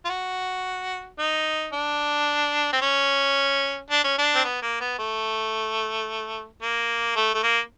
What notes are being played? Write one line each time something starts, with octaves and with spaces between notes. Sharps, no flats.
F4
F#4
D#4
D4
C4
C#4
D4
C#4
D4
C4
B3
A#3
B3
A3
A#3
A3
A3
A#3